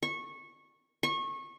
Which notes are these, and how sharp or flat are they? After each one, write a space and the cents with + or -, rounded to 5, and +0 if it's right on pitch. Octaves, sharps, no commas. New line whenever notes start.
C#6 -15
C#6 -25